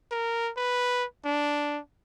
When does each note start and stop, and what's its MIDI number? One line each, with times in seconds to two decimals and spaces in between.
0.11 0.51 70
0.57 1.05 71
1.25 1.80 62